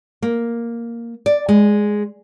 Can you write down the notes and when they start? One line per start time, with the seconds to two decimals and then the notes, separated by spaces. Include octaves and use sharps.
0.22 A#3
1.26 D5
1.49 G#3